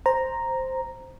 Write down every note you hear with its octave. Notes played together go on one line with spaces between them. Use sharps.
C5 A#5